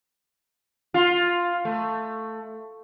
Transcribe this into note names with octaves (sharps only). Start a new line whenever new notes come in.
F4
A3